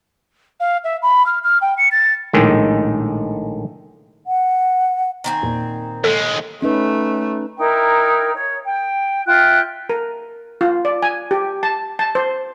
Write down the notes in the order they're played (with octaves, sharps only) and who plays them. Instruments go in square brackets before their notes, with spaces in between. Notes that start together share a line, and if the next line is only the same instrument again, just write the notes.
[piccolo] F5
E5
B5
F6
F6
G5
C#7
A6
[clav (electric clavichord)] A#1 A2 D#3 G#3
[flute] F#5
[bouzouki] D#3 C4 G#5
[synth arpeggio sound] E2 [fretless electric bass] A#2
[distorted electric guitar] D#2 G#3 [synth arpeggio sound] A4
[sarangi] A3 [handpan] C#4 D#4 B4
[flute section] D#4 E4 A#4 G5
C#5
G5
F4 E5 G5 F#6
[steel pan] A#4
F4
D5
G#5
G4
A5
A5
C5